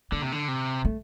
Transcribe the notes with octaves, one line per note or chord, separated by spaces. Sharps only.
D3 A#3
C3
D3
C3
A3